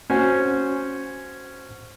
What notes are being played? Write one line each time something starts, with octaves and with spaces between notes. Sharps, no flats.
C#4 F#4 C5 G#5